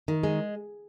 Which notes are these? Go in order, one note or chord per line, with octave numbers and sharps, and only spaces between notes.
D#3
G#3